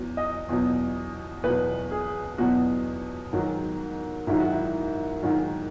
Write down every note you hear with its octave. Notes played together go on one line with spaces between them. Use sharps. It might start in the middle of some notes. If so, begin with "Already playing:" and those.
Already playing: E2 F#3
D#5
E2 B2 F#3
E2 B2 F#3 B4
G#4
E2 B2 F#3 F#4
G#2 D#3 F#3
G#2 D#3 F#3 E4
F#4
E4
G#2 D#3 F#3